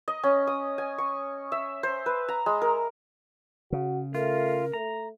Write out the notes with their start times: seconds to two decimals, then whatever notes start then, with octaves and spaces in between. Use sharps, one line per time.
0.08 D#5
0.23 C#4
0.47 D#6
0.78 G#5
0.98 C#6
1.52 E5
1.83 C5
2.06 B4
2.28 A#5
2.46 G#3
2.62 A#4
3.72 C#3 F#4
4.15 A3 F4 A#4
4.74 A3 A#5